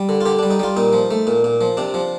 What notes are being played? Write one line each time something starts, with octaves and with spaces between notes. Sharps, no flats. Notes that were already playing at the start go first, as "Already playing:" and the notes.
Already playing: G3
D3
F4
D3 G4
G3 D4
D#4
G3 F4
A#2 D#4
F3
A3
A#2
A#2
F3
C3 D4
F3